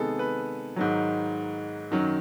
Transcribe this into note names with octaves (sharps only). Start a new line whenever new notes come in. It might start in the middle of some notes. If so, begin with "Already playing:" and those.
Already playing: C3 D#3 G#3 B3 G#4 A4
B4
G#2 D#3 F#3
F#2 D#3 F#3